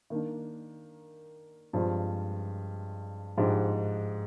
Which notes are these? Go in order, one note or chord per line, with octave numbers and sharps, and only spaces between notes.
D#3 A#3 D4
G2 F3 G#3 C4 F4
G#2 F3 G#3 D4 G4